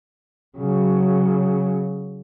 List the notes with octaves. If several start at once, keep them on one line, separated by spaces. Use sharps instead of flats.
C#3 F#3